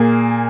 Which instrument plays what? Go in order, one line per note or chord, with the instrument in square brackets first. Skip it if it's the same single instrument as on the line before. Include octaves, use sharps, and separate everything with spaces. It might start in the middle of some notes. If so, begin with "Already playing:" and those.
Already playing: [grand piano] A#2 A#3 G#4